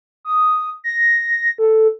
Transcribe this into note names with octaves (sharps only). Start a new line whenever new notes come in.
D#6
A#6
A4